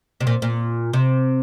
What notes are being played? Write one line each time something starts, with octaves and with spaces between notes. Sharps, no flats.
C3
A#2
A#2
C3